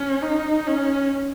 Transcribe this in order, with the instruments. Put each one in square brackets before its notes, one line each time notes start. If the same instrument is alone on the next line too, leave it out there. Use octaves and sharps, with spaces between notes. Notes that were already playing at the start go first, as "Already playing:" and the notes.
Already playing: [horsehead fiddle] C#4
D#4
C#4